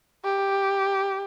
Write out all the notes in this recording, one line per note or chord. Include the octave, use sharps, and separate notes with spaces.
G4